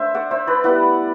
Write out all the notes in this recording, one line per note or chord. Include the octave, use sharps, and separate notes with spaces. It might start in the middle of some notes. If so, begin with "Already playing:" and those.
Already playing: A3 D4 C5 E5
D5 F#5
C5 E5
B4 D5
G3 B3 E4 D5 F#5